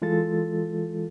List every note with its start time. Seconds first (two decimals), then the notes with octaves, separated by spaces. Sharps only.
0.02 E3 G#3 F4 A4 A6